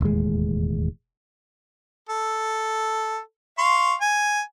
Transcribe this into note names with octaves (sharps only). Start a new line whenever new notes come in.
E1 D#2 A2 G#3
A4
F5 C6 C#6
G#5